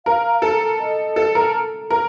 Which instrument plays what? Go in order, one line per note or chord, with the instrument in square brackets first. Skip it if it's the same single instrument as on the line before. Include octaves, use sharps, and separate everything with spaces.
[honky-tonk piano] A#4 [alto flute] F5
[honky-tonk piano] A4
[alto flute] D#5
[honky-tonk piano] A4
A#4
A#4